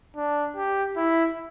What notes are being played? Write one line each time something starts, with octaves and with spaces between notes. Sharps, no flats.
D4
G4
E4